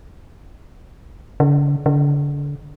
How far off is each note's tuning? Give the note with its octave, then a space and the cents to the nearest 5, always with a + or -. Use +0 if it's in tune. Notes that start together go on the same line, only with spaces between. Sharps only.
D3 -45
D3 -35